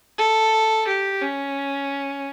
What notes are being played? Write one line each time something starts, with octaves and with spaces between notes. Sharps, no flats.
A4
G4
C#4